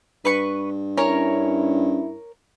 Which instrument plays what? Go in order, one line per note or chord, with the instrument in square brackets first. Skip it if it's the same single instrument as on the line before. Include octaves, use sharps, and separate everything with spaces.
[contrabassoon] G2 [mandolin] B4 C#6
[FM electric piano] C#4 [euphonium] E4 [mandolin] A#4 C#5